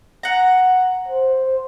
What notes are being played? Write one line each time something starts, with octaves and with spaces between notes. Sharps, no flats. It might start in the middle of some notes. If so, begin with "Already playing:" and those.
F#5 A#5
C5